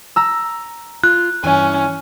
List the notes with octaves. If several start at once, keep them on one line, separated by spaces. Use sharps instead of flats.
A#5 E6
F4 F#6
G2 E3 C#4 G#5